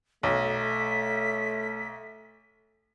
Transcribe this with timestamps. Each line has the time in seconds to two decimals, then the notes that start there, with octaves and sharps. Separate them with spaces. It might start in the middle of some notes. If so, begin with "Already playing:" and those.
0.23 B1 A3 B6